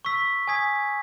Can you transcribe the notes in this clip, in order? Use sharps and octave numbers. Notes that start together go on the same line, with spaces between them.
C#6 E6 B6
G#5 D#6 G#6 B6